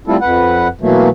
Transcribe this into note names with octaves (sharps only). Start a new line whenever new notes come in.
G3 A3 C4 E4 F4 A4
F2 B4 F#5
B2 E3 F#3 A3 A#3